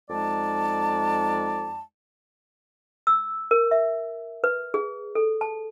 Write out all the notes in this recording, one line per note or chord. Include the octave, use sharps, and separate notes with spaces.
F2 G#3 D#4 D5 A5
E6
A#4
E5
B4
G#4
A4
A5